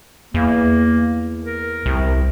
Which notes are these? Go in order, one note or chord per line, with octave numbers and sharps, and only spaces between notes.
E2 A#3
A#4
C2